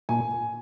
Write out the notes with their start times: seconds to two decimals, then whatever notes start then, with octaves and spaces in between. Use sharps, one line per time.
0.09 A#2 G#5